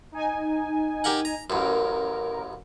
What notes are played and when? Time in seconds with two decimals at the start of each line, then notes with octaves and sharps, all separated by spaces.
0.12 D#4 G#5
1.04 G4 A#4 F#5
1.25 A#5
1.50 A1 F#2 A#4